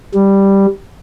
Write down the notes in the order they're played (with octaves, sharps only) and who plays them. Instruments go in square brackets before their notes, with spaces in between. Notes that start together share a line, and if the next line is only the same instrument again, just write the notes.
[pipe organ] G3